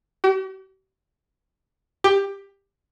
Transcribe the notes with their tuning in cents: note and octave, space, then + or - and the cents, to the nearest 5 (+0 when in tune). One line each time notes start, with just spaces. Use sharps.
G4 -45
G4 +15